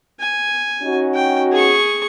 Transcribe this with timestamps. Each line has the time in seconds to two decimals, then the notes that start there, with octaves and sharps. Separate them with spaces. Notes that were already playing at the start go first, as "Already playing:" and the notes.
0.20 G#5
0.83 C#4 D#4 F#4
1.14 G5
1.52 G#4 C#6